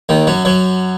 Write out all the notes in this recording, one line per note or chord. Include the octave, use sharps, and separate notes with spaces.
D#2 D#3
F#2 F#3
F#2 F#3